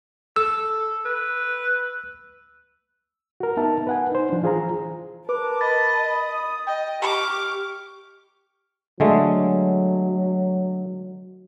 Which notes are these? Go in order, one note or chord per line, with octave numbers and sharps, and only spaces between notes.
A4 E6
B4
F#4 A#4
B3 D#4 A#4 E5 A5
B4 F#5 G#5
D#4 C5
F3 D4
E3 F4 G#4 C5 A#5
A#4 B4 A5 D6
D#5 B5 A6
D#6
D#5 G5
G4 C#6 D6 F6
D3 F#3 G#3 A3